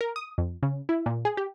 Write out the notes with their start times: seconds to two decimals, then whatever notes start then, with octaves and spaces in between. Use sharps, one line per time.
0.01 A#4
0.16 D#6
0.38 F2
0.63 C#3
0.89 E4
1.06 A#2
1.25 G#4
1.37 G4